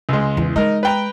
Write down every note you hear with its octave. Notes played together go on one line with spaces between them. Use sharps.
C#2 G#3
E2 E3
G#3 D#4 A#4
B4 G5 A#5